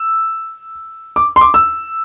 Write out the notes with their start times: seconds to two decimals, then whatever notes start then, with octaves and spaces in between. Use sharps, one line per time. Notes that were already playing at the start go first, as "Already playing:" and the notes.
Already playing: E6
1.16 D6
1.36 C6
1.41 D6
1.54 E6